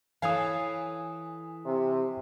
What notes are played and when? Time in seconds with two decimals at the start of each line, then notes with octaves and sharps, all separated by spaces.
0.22 E3 A4 C#5 F5 G#5 D#6
1.66 C3